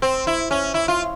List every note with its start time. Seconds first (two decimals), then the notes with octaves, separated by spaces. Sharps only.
0.02 C4
0.27 E4
0.51 C#4
0.74 E4
0.88 F4